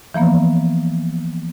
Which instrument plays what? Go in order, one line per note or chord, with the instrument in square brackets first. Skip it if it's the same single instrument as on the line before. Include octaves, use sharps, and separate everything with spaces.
[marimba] E3 F3 A#3 B3